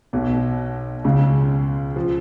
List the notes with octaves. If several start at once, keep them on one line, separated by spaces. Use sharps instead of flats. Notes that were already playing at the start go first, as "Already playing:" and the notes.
B1 B2
C#2 C#3
F3